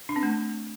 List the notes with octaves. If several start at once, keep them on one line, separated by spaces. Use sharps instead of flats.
D4
C4
A3